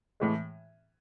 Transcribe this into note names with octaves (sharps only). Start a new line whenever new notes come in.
A2 E3 G#3